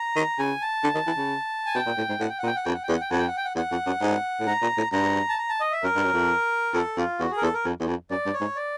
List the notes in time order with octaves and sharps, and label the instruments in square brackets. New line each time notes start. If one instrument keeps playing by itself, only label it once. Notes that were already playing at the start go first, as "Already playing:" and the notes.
Already playing: [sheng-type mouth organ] A#5
[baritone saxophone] D#3
[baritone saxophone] C#3 [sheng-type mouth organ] G#5
[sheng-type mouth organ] A5
[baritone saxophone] D3
D#3
E3
C#3
[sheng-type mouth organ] G#5
[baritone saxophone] B2 [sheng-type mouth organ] G5
[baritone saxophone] A#2
A2
G#2
[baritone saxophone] A2 [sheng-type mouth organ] F#5
[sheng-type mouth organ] G5
F#5
[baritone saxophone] A#2
[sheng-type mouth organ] G5
F#5
[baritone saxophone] F2 [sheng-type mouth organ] G5
[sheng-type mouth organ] F#5
G5
[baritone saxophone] E2
[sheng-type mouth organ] F#5
G5
[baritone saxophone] F2 [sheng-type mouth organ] F#5
[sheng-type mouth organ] G5
F#5
G5
F#5
[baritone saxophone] E2 [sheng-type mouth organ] F#5
[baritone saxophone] F2
F#2
G#2
A2
[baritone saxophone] G#2 [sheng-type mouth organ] A#5
[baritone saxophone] A#2
A2
[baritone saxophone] G2 [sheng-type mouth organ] A#5
[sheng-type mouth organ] A5
A#5
A5
D#5
E5
[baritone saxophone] F#2 [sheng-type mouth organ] A#4
[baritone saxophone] G2
F#2
F2
[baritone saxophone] F2 [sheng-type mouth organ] A4
[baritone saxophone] F2 [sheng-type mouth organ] F4
[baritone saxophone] E2 [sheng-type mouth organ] F#4
[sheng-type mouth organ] G#4
A#4
[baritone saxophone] E2 [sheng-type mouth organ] A4
[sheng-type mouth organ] A#4
[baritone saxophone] F2
E2
F2
[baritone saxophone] F#2 [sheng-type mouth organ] D5
[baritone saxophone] G2
[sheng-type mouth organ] C#5
[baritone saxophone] G#2
[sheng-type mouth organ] D5